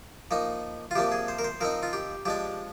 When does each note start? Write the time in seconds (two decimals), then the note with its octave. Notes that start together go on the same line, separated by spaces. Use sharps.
0.31 F3 A#3 D#4
0.91 F4
0.95 C3 F3 A#3 D4 G4
1.12 G#4
1.28 C5
1.39 A#4
1.44 C5
1.61 F3 C4 D#4 A#4
1.83 F4
1.93 G4
2.25 F3 G#3 D4 G4